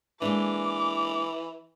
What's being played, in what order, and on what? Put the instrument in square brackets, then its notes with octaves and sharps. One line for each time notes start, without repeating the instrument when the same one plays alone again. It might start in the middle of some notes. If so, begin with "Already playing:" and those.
[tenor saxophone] E3 [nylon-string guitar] G#3 A#3 D4 [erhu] D6